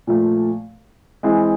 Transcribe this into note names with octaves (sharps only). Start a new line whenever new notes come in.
A#2 F3 A3
E3 G#3 C4 E4 G#4